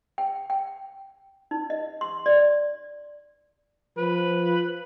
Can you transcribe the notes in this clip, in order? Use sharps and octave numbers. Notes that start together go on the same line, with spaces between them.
G5
G5
D#4
D#5
C6
D5
F3 B4